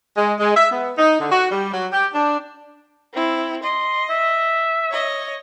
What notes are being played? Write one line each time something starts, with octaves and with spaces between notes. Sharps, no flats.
G#3
G#3
E5
B3
D#4
D3
F#4
G3
F#3
G4
D4
C4 E4
D#5 C6
E5
C#5 D#5